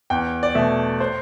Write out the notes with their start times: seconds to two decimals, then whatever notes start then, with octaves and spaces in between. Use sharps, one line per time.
0.10 E2 G5
0.43 D5
0.55 B2 A3 E5
1.00 C5